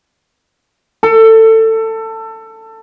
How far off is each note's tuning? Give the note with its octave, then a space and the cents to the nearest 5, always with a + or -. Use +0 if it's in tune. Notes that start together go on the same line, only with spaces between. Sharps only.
A4 +20